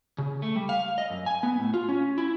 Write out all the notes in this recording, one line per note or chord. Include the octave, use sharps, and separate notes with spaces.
C#3
A3
G3
F5
D#5
F#2
G#5
B3
A2
F4
C#4
E4